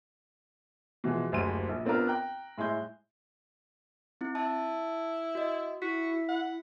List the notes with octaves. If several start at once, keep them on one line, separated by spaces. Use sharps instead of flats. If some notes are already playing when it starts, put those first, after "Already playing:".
B2 E3 F3 G#3
F#1 D2 G#3 G4 D#7
A#1
B3 C4 D4 F4 A#4
G5 A#5 F#6
A2 G#3 E4 C6 G6
C4 E4
E4 A5
F#4 D#5
E4 F#4 B6
F#5